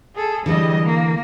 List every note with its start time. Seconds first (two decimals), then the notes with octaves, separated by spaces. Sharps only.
0.15 G#4 A4
0.46 D3 E3 G3 G#3 D#5
0.85 A#3